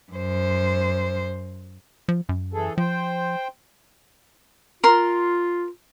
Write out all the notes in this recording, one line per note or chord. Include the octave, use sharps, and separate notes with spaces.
F#2 C5
F3
F#2
E3 G#4 A4
F3 C5 G5
F4 A#4 C6